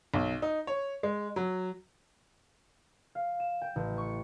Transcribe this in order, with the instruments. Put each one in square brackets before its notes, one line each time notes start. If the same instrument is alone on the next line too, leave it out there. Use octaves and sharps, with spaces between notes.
[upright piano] B1
D#4
C#5
G#3
F#3
[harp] F5
E7
G5
A1
C#6